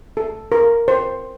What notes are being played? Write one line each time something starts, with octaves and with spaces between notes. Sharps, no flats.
A4
A#4
C5